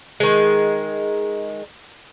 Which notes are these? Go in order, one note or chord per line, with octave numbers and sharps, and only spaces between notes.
D#3 G#3